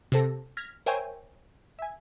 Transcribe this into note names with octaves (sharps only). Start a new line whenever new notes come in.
C3 C4 A4 A#6
F6 G#6 A#6 B6
A#4 C5 C#5 E5 G5 G#5
E5 G#5